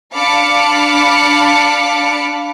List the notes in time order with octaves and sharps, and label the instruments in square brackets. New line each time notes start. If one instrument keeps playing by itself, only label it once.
[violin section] D4 F5 A5 B5 D6 C#7